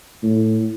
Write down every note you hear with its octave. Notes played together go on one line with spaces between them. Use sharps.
A2